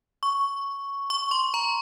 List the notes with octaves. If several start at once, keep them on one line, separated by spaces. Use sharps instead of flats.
C#6
C#6
C6
A#5